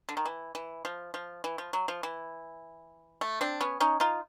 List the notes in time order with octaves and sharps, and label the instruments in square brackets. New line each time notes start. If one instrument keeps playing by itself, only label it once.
[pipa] D3
D#3
E3
E3
F3
F3
E3
F3
F#3
F3
E3
A3
C4 D4
B3 C#4
C#4 D#4
D#4 F4